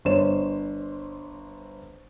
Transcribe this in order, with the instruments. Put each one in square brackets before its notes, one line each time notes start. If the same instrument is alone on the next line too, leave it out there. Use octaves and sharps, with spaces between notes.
[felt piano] G1 C5 C#5 E7